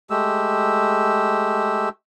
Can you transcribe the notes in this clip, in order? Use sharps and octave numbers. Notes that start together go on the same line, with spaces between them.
G#3 A3 G4 E6